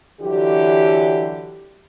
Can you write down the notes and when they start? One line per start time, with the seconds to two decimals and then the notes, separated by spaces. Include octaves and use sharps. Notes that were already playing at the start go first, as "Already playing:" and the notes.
0.21 D3 E3 F#3 G4